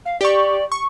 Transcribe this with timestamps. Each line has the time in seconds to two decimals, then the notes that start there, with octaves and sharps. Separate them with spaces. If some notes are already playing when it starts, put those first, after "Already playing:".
0.05 F5
0.21 G4 D5 C#6
0.72 C#6